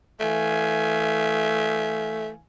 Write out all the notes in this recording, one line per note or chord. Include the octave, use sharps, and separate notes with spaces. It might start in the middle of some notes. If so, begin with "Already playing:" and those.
E3 A3 F5 G#5